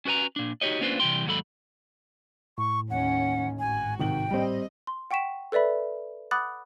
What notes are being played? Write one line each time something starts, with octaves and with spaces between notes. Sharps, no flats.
C#4 F#4 B4 G#5 A#5
A#2 D4
D#4 F#4 G4 C#5 D#5
A#3 C#4 D4 F4 B4 C5
C3 E3 F3 G3 G5 C6
D#2 G#2 F#3 A4 B5
A2 C#6
D#2 C#4 F#5
G#1 F#4 G#5
C3 D#3 G5 F#7
G3 C4 D#5
C6
F#5 G5 C#6 B6 E7
A4 B4 D5 E5 B5
F#5 B5 D6 D#6 F#6 A6